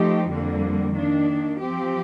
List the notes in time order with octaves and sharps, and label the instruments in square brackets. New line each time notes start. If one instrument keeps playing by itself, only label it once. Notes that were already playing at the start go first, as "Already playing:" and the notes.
Already playing: [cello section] F3 A3 D#4 G4
F2 D3 G3 A#3
D#3 A#3 D4
F3 C4 G4